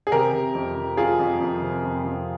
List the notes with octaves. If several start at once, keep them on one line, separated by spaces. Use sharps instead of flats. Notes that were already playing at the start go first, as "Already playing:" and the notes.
G#4
C3 G4 A#4
C3
F2
F2
F2 F4 G#4
F2
F2
C3
F2
F2